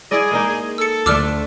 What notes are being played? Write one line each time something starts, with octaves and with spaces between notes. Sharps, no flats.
E4 G#4 D5 D#5
G#3 A#3 D#4
A4 E6 C#7
D2 D3 A3 D4 F4 D6 E6 F6